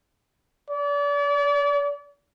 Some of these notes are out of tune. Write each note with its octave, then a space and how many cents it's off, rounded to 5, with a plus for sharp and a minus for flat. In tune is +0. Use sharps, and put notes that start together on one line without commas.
D5 -35